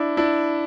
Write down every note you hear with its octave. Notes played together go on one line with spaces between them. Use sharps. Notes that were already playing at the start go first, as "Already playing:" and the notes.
Already playing: D4 E4
D4 E4